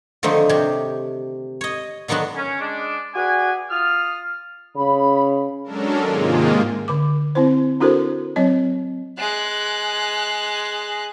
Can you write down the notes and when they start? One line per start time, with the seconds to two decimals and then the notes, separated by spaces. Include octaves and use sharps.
0.23 D3 D#3 F3 A3 C4 D#4
0.49 C3 G4
1.61 C#5 D#5
2.08 D3 D#3 F#3 B3 F#4
2.35 C#4
2.60 G#3 D4
3.15 F#4 G#4 B4 D5 G#5
3.69 F4 D#6 F6
4.76 C#3 B5
5.64 F#3 G#3 C#4 D4 A4 A#4
6.01 G#2 C3 D#3 G#3 A#3 F4
6.88 D3 D6
7.35 C4 E4 C5
7.80 D4 E4 F#4 A4 A#4 C5
8.36 F#3 C4 C#5 D#5
9.18 G#3 F#6